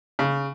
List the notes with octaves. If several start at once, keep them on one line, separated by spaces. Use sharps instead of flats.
C#3